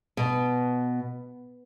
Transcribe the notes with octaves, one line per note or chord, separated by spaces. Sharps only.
B2